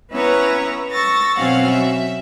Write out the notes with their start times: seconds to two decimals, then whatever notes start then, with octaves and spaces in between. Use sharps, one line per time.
0.11 B3 C#4 E4 B4 C#5 A#5
0.91 C#6 E6 A6 A#6
1.36 B2 F#3 C4 C#4 F5 F#5
1.70 E5